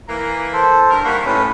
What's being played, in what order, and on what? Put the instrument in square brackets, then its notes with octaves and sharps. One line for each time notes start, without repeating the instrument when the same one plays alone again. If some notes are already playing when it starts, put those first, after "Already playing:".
[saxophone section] E3 A#3 [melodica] A#5
[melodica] A4 C5
[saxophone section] G2 A#4
[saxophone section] D#3 G3 A#3 [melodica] F#5 B5 C#6
[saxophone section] A2 [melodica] C#4 B4